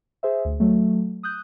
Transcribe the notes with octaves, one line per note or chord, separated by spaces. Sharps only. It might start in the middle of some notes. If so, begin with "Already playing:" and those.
G#4 C5 E5
D2
F#3 A3
D#6 F#6 G6